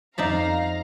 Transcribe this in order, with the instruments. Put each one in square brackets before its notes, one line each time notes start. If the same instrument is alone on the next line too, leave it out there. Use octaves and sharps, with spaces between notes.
[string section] F2 F5 A#5 [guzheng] D#4 D5 E5